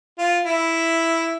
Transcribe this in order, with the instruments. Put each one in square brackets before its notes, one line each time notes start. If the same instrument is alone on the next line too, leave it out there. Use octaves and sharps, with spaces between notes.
[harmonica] F4
E4